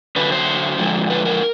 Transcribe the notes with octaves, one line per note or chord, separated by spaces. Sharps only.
D3 F#3 B4
C5
D3 F3 G#3
B4
A#4